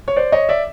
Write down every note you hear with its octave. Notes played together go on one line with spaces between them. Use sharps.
C#5
C5 D5
C#5 D#5
D5 E5